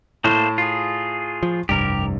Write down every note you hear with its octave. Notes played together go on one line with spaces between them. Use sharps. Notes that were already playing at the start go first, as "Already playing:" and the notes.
A2 A3 A#3 C5
F4 G#4
F3
F1 C2 G2 G4 A#4